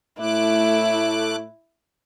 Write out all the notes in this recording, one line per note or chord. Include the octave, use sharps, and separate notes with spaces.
A2 A3 E4 D6 F#6